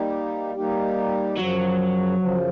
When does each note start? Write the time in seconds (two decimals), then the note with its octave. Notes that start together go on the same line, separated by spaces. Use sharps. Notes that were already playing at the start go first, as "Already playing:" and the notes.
Already playing: G3 A#3 D#4 G4
0.55 G3 A#3 D#4 G4
1.37 F#2 C#3 F3 F#3
2.19 F#2 C#3 F3